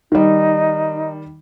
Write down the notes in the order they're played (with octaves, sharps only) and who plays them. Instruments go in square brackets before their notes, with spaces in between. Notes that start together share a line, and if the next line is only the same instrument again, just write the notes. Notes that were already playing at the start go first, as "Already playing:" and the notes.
[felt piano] D#3 G3 [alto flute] D#4